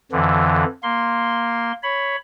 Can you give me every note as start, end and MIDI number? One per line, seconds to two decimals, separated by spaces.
0.12 0.64 41
0.12 0.64 50
0.12 0.64 52
0.83 1.72 58
0.83 1.72 84
1.83 2.16 73
1.83 2.16 83